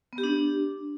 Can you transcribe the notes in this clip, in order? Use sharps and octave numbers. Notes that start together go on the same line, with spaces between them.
B3
G4
D4